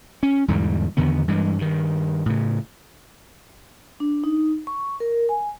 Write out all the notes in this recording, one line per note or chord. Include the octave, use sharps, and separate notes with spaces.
C#4
E2 G#2 D3 G3
E2 D3 D#3 B3
G2 E3 G#3
G2 D#3
A2 C#3
D4
D#4
C#6
A#4
G#5